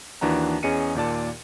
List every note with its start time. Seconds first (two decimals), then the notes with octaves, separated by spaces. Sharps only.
0.21 D#2 E3 D4 F#4 A#5
0.63 E2 C#4 G#4 D#5 C#7 D#7
0.95 D#2 A#2 D5 A5